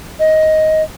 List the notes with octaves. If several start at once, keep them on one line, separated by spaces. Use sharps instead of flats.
D#5